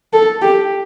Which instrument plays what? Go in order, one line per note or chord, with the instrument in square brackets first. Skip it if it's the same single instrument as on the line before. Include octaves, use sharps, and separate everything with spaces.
[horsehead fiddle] A4
G4